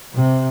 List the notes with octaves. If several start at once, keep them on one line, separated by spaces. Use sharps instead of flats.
C3